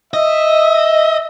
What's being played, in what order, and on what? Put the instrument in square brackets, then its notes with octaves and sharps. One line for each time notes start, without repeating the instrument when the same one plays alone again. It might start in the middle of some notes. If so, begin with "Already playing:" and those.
[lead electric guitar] D#5 [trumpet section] E5